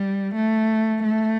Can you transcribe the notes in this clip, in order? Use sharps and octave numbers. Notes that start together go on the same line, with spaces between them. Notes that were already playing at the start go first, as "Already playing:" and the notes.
Already playing: G3
A3
A3